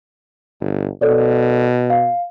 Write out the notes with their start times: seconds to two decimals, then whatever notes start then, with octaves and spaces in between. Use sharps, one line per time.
0.60 G1
1.01 B2 A4 C#5 D5
1.90 F5